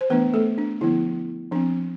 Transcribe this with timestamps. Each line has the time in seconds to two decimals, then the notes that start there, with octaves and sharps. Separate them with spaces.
0.01 C5
0.10 E3 A3 B3 D4 B4
0.33 A3 A4
0.58 D4
0.81 D3 F3 B3 E4
1.52 F3 C4 D4